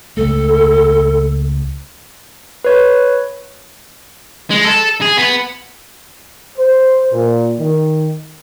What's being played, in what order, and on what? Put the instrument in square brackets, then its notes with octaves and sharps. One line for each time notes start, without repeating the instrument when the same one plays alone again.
[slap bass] C#2 A3 [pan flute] A4
[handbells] B4 C#5
[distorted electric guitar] G#3
A4
G#4
B3
[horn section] C5
A#2
D#3